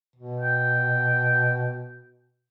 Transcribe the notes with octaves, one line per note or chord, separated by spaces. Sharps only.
B2
G5